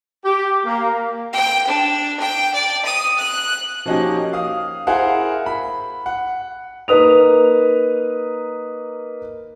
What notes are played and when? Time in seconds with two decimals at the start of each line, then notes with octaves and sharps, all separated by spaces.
0.25 G4
0.65 A#3
1.32 G5
1.66 D4
2.18 G5
2.52 D5
2.84 D#6
3.17 F#6
3.86 F3 A#3 C#4 D#4 F#4 G4
4.33 F5 D#6
4.87 E4 G#4 A#4 C5 F5 F#5
5.46 B5
6.06 F#5
6.88 A#3 D#4 B4 D#6 F7